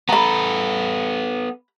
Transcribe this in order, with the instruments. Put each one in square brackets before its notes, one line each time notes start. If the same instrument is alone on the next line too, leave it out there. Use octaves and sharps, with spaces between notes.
[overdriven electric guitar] B3 A4 [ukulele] A#5 B5